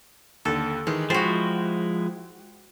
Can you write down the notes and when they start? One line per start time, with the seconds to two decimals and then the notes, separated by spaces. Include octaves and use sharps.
0.45 D#2 D3 A4
0.87 D#3 E3 G#3
1.10 F3 G#3 E4 F#4 C5 G5 A6